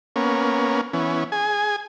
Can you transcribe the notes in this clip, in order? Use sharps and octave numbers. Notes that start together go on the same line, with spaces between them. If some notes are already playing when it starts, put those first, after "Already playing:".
A#3 B3 C#4
E3 B3 C#4
G#4 G#5